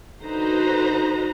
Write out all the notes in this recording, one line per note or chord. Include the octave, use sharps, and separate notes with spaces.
D3 D#4 F#4 B4 C5 A#5